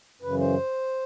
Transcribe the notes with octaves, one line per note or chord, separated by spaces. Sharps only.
F#2 C#3 E3 B4
C5